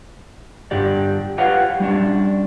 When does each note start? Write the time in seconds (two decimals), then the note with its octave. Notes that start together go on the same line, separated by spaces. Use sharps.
0.71 G2 D3 G4 D5
1.38 F4 G4 B4 C#5 F5 F#5
1.80 G3 C#4 D4